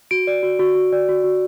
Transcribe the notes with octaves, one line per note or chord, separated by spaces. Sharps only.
F#4 D7
D5
F#4
F#4
F#4
D5
F#4
F#4